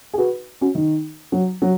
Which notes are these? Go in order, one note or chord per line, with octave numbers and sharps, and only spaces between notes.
G#4
F#4 B4
C#4 F#4
D#3
F#3
F#3